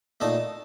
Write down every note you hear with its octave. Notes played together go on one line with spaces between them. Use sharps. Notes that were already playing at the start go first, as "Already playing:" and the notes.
A#2 A3 D#4 A5